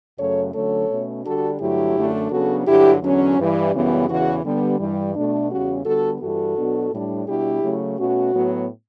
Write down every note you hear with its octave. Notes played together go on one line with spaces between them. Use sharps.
F#2 C#3 F#3 A3 A4 C#5
D3 F#3 A3 C#4 A4 C#5
B2 A3 C#4
D3 G3 D4 F#4 A4
G2 D3 F#3 A3 E4 G4
F#2 D3 A3 D4
C#3 F#3 B3 D4 F#4 A4
G2 D3 F#3 E4 G4
E2 D3 F#3 C#4
G2 E3 G3
F#2 C#3 E3 G3 B3
E2 C#3 E3 F#4
D3 G3 B3
G2 E3 G3
B2 A3 D4
E2 C#3 G3 C#4 F#4
D3 G3 B3 F#4 A4
G2 E3 G3 F#4 A4
B2 F#3 B3 D4
A2 G3 D4
B2 G3 B3 D4 E4 G4
C#3 F#3 A3
B2 A3 C#4 F#4
A2 F#3 B3